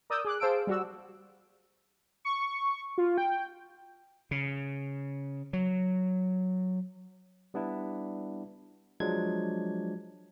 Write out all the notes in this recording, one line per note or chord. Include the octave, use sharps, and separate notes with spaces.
A#4 D5 D#6 E6 G6
G#4 D6 F#6
G#4 C5 F5 A5 E6 D7
G3 F#4 E6
C#6
F4
G5
C#3
F#3
G3 B3 D4 E4
F3 F#3 G#3 D4 G#6